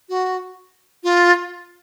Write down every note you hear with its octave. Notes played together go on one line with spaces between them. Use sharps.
F#4
F4